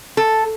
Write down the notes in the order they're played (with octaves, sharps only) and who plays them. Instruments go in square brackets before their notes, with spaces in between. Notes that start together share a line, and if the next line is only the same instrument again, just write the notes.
[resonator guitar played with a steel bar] A4